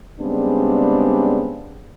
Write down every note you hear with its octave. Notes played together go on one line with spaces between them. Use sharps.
C#3 G3 G#3 B3 C4 D4